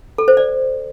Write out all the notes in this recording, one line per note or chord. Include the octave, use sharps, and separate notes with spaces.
A4
C5
D5